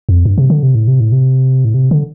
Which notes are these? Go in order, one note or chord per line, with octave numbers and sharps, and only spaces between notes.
F2
G2
C3
D3
C3
A2
C3
A2
C3
A2
C3
D3